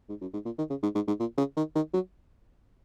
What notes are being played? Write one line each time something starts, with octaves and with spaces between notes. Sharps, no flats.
G#2
F#2
G#2
A#2
D#3
C#3
G#2
G#2
G#2
A#2
C#3
D#3
D#3
F#3